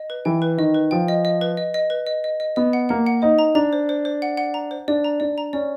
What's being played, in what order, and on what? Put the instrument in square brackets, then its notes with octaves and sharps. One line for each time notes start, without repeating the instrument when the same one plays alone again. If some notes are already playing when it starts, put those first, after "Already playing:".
Already playing: [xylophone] D#5
B4
[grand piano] E3 [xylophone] G5
[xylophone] B4
[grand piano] D#3 [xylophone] D#5
[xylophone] B4
[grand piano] F3 [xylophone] G5
[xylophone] D#5
D#5
B4
D#5
D#5
B4
D#5
D#5
D#5
[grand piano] B3 [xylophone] D#5
[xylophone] F#5
[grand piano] A#3 [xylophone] F#5
[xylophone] F#5
[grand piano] D#4 [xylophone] C5
[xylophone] A#5
[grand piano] D4 [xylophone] A#5
[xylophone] C5
C5
C5
F#5
F#5
A#5
C5
[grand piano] D4 [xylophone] D5
[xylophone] A#5
[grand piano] D4 [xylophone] D5
[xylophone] A#5
[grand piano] C#4 [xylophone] D5